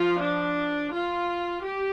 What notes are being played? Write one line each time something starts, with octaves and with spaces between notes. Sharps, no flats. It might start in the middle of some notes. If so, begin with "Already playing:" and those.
Already playing: F3 F4
D4
F4
G4